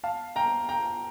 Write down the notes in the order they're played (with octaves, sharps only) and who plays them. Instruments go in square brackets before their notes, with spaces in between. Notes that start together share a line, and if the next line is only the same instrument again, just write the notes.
[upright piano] F5 A5
G5 A#5
G5 A#5